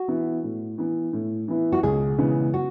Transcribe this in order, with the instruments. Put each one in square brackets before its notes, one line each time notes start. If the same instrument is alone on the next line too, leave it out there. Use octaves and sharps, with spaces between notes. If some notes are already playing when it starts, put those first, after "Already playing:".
Already playing: [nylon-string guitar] F#4
[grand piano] E3 B3 E4
A2
E3 B3 E4
A2
E3 B3 E4
[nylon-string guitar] F#4
[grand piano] C#2 [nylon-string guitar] G#4
[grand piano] C#3 E3 G#3 B3
[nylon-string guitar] F#4